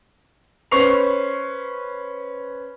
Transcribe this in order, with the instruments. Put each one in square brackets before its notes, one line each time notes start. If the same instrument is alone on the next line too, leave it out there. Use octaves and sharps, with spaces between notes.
[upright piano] C#4 B4 C5 C#6 C7 F7